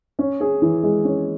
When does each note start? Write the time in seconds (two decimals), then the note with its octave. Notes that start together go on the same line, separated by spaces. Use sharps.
0.19 C#4
0.41 G#4
0.62 E3
0.83 G#3
1.04 C#4